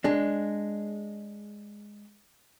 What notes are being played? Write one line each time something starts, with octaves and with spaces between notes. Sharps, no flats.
G#3 D4